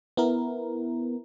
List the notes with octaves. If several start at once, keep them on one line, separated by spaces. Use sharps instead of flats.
B3 E4 A#4